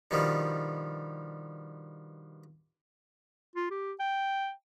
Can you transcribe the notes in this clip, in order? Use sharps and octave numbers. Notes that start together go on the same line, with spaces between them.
G2 B2 D#3 F3 G3
F4
G4
G5